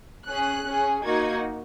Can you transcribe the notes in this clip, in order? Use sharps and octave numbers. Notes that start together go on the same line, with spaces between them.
C#4 G#4 F#6
C#4 G#4
A#3 D#4 F#4 G#6